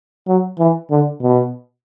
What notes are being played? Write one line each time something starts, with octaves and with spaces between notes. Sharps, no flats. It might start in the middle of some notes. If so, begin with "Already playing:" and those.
F#3
E3
D3
B2